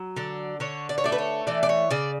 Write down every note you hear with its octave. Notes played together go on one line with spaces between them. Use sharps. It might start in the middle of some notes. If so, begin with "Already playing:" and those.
Already playing: F#3
D3 D5
D3 C#5
D5
C#5
A3 D5
B4
C#5
E3 D5
D5
C#5
C#3 D5